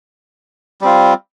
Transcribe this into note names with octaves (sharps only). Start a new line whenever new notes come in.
G3 C4 F4